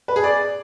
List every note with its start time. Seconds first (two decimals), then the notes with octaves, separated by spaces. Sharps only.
0.08 B4
0.16 G#4
0.24 D5